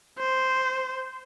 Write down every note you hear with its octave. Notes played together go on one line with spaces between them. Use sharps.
C5